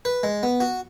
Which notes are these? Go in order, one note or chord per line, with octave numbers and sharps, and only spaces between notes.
B4
G#3
B3
F#4